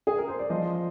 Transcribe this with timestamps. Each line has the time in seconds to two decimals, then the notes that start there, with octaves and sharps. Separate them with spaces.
0.07 G#4
0.18 A#4
0.28 C5
0.39 D5
0.50 F3 C5 D#5